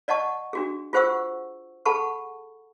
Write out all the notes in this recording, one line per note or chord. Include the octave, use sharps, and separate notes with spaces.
D5 D#5 F#5 A5 C#6
D4 F#4 G#4
F4 G#4 C5 F#5 C#6 E6
G#4 A4 F#5 A5 B5 C#6